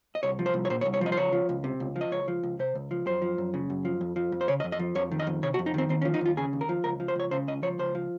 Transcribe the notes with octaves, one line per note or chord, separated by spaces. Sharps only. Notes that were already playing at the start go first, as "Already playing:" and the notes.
D#5
C2 C#5
F3
C5
C2
C#5
A#2 C5
C#5
C2
C#5
F3 D#5
C5
C#2 C#5
F3
C#2
C3
C#2
F3
D#5
C#2 C#5
F3
C#2
C3 C5
C#2
F3
F#2 C5
F3
F#2
C#3
F#2
F3
F2
F3
F2
C5
C#3 C#5
D#5
F2
D#5
F3
F2 C#5
D#3
D#5
F2
C3 C#5
F#4
F2
D#4
D#3 C4
D#2 C4
C#4
F3
D#4
D#2 F4
C#3 G#4
D#2
A#4
F3
C#2 A#4
F3
C5
C#2 C#5
C#3 C5
C#2 D#5
F3 C#5
C#2 C5
F3